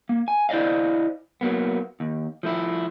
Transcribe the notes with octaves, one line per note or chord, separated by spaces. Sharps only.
A#3
G#5
E4 C5 D5 D#5 F5
F#3 A#3 B3
D#2
F3 A3 E4